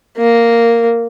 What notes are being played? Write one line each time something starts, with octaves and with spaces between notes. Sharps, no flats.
A#3